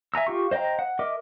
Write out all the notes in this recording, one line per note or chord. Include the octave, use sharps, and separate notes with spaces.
E5 G#5 A#5 E6
F4 G4 C#6
C5 D#5 F5 G5 A#5
F#5
A#4 D#5 E5 D6